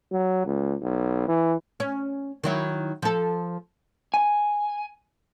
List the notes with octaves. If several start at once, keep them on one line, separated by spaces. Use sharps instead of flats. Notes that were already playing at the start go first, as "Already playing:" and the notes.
F#3
C#2
B1
E3
C#4
D#3 F#3 E4
F3 A4
G#5